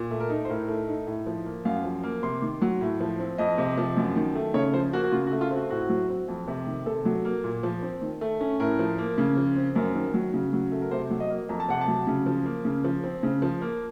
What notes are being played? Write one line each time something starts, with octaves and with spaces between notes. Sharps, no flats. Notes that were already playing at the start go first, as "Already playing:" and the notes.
Already playing: A#2
A3
A#4
D#4
C5
A2 A#4
A3
D#4
A2
F3
A#3
F#2 F5
F3
A#3
C3 C6
D#3
F#3
A2
F3
C4
F2 D#5
C3
F3
F#2
D#3
A3
C#3 C#5
F3 C5
A#3 F#4
F#4
C#3 F4
F#4
A3
F4
C4 F#4
A2 F#4
F#3
C4
F2
C3
D#3
C3 A4
F#3
A#3
A#2
F3
C4
D#3
A3
C#4
A2 A#4
F3
A#3
C#3
F3
C4
F#2 A#4
D#3
F#3
C#3
F#3
A3
A#4
C3 C5
F#3
D#5
A#3
F2 A#5
A5
C3 F#5
A5
F#3
C#3
F3
A#3
C#3
F3
C4
C#3
F3
A#3